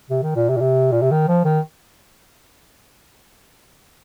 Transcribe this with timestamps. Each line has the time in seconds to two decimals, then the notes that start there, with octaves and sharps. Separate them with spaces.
0.10 C3
0.23 D#3
0.36 A#2
0.49 C3
0.56 A#2
0.60 C3
0.92 A#2
1.02 C3
1.11 D#3
1.28 F3
1.45 D#3